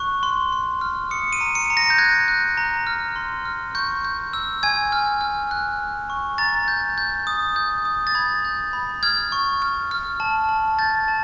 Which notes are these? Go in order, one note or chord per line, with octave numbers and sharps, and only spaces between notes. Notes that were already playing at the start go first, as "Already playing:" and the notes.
Already playing: C#6 F#6
C6
C6
F6
D#6 C#7
D#7
A#5
C#7
A#5
A#6
G6
F#6 G#6
F#6
A#5
F6
C6
F6
C#6 G6
G6
E6
G#5 G#6
F6
F6
F#6
F#6
C#6
A#5 A6
G6
G6
D#6
G6
D#6
A6
B5 G#6
G6
B5
F6 G#6
C#6
F6
F6
A5
A5
G6 A6
A5